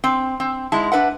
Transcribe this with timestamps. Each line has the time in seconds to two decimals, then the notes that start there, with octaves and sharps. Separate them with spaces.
0.04 C4
0.40 C4
0.72 G#2 G#3 E4 A5
0.92 D4 B4 E5 F#5